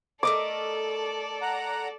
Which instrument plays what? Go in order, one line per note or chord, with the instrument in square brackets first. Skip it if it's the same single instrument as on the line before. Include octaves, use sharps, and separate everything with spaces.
[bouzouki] A3 A#4 D#5 [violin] A4 D5 [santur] D6
[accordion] F#5 A#5